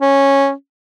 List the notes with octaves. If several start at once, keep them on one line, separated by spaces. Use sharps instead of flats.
C#4